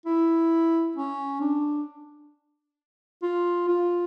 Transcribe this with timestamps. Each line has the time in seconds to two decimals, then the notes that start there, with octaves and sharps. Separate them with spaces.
0.06 E4
0.96 C#4
1.41 D4
3.23 F4
3.68 F4